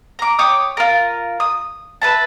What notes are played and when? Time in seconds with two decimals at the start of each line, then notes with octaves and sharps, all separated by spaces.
0.19 A#5 D6
0.39 G4 C#5 D6 D#6
0.77 F4 A#4
1.40 D#6
2.02 B4 E5 A5